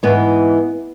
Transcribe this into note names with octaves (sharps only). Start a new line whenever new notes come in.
G#2 E3 B3